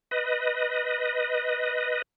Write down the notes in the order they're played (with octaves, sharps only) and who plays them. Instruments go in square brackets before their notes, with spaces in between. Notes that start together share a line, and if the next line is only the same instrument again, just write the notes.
[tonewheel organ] B4 D#5